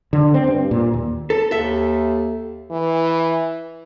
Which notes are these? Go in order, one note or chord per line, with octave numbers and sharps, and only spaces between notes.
D3
C4
G2
A#2
D#2
A4
D#2 A4 E5
E3